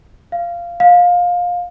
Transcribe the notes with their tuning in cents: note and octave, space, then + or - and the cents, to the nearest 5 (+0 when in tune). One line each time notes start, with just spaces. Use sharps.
F5 -15
F5 +20